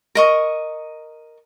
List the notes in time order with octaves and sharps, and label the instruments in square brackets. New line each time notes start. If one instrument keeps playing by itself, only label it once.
[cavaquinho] A#4 D#5 C#6